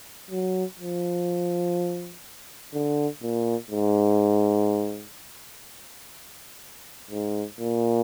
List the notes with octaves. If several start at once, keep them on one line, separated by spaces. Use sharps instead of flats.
F#3
F3
D3
A#2
G#2
G#2
A#2